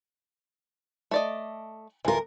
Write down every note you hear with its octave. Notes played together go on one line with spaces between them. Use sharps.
A3 D5 D#5
D2 E3 F4 A#4